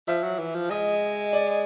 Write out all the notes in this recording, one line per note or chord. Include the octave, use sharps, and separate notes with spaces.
F3 E5
F#3
E3
F3
G#3 D#5
D5